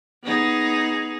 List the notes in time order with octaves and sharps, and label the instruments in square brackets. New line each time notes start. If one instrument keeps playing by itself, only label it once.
[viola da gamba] B3 D#4 G#4